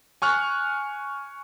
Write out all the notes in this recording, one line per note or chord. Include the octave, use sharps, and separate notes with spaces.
G#5 C#6 F6 F#6